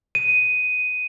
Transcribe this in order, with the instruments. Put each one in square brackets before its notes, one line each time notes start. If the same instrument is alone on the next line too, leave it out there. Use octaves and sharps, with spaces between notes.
[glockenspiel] D#7